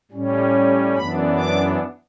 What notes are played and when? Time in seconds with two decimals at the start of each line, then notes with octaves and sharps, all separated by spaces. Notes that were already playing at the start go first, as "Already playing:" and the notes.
0.11 A2 G3 C#4
0.95 F#2 E3 B3 D4 B5
1.37 D6